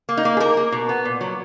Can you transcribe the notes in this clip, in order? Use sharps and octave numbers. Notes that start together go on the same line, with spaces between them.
A#3
D#4
A#3
G#4
A#3 A#4
A#3
B2
B3
A#2
F#3